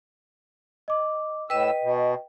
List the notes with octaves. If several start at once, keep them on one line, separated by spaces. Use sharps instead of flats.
D#5 D6
A2 B4 D#5 G5 E6
B2